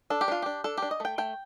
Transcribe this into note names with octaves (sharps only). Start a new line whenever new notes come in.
D4 A4
G4
D4 F4
D4 G4
D4 A4
D4 G4
D#5
A3 G5
A3 G5